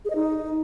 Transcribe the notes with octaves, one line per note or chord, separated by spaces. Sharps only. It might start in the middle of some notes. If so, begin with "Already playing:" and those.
G#4
D#5
D#4